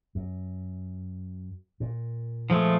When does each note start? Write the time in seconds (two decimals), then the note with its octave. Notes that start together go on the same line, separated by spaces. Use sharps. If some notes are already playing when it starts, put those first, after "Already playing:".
0.15 F#2
1.80 A#2
2.50 F3 G#3 A3